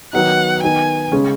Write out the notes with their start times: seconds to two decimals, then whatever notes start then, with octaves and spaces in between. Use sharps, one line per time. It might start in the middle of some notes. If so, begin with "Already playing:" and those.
0.13 D#3 F#3 B3 D#4 F#5
0.63 D#3 B3 D#4 G#5
1.12 C#3 G#3 C#4